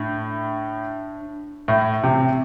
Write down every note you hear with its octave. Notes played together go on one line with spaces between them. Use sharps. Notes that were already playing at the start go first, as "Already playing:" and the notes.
Already playing: A2 D4
A2
C3 C4